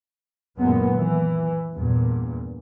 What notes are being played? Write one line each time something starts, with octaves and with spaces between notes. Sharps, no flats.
F#2 A#2 D#3 G#3 A#3 B3
E3
E2 G2 A#2